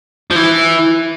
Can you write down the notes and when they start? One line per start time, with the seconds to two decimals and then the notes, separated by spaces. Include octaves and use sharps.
0.31 F3
0.36 E3